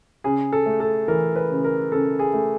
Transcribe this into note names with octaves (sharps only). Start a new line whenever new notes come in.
C#3 G#4
A4
A3
A4
E3 A#4
B4
C#3
A#4
C#3 A4
G#4
A3